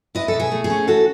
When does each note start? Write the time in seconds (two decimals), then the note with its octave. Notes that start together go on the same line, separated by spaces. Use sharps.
0.15 E4 B4 D#5
0.28 A4
0.33 B2
0.40 G#4
0.52 A3
0.64 G#4
0.70 C#4
0.88 E3 F#4 A4